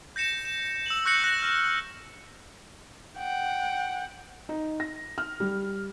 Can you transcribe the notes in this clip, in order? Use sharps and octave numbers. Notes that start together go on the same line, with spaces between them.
G6 A#6 C#7 E7
E7
E6 E7 F#7
C#6 F#6 G6 A#6 C#7 F#7
F#6 A#6 C#7
F6 A#6 E7
F#5 G5
D#4
A#6
F6
G3